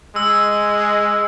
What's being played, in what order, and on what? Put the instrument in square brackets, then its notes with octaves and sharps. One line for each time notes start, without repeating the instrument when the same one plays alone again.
[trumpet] G#3 [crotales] E6